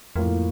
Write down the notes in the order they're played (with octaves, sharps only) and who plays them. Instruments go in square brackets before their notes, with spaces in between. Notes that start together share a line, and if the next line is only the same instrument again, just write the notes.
[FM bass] F2 [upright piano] A2 F3 A#3